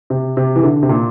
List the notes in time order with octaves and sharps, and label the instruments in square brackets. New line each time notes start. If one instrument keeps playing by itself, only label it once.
[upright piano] C3
C3
E3
D3
C3
A#2